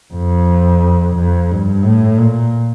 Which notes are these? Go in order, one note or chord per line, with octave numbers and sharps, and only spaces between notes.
F2
F2
G2
A2
A#2